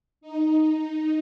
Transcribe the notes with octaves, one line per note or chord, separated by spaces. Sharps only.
D#4